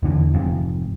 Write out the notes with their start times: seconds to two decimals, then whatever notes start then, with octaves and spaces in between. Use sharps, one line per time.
0.03 E2 D3 E3
0.34 F1 F2 G#2